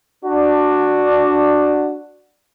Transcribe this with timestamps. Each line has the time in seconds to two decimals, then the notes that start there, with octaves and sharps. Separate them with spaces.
0.24 D4 F#4